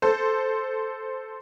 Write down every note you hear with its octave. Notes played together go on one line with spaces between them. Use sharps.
A4 C5